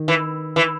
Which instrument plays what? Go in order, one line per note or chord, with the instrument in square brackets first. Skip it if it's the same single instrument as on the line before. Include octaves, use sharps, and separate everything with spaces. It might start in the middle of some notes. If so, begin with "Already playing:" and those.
Already playing: [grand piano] D#3
[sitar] E3
E3